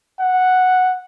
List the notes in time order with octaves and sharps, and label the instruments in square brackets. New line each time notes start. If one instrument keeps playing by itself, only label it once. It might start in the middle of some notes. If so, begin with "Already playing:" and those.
[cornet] F#5